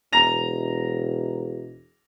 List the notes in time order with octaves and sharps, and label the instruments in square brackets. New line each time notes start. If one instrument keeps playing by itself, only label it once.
[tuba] E1 [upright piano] A#5 A#6 F7